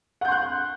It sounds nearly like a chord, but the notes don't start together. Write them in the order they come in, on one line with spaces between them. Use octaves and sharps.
F#5 G6 C6 F#6